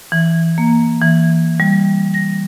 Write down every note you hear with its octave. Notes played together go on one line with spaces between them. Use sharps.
E3
A#3
E3
G3
A#6